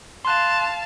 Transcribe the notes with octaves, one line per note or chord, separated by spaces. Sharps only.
F5 A5 C6 F#6